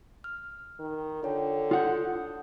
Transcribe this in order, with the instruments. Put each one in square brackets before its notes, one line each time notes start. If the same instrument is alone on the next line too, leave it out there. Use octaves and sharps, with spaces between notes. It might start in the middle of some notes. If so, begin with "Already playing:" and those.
[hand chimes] F6
[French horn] D#3
[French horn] D3 [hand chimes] F4 C#5 G5
[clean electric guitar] F4 F#5 [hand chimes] D#6 G6